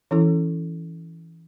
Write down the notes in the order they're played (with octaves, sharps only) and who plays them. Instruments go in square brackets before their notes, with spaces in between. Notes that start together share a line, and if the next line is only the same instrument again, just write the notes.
[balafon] E3 C#4 E4 A4